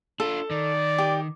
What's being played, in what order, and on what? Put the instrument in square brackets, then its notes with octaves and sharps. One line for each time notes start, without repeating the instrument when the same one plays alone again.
[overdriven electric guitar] D4 F4 [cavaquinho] A4
[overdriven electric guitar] D#3 [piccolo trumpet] D5
[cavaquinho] G4